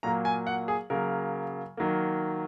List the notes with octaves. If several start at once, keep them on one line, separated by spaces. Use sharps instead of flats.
A#2 F#3 A#3 A#5
G#5
F#5
G#4
C#3 F#3 A#3 A#4
D#3 F#3 A#3